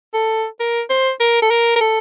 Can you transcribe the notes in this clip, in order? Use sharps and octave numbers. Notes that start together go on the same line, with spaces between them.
A4
A#4
C5
A#4
A4
A#4
A#4
A4